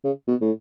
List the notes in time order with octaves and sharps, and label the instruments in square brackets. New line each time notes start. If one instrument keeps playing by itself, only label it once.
[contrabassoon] C#3
B2
A2